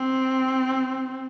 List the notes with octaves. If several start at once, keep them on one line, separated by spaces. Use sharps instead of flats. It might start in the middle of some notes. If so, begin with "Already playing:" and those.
Already playing: C4